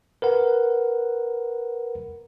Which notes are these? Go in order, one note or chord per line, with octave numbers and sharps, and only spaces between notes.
A#4 B4 F#5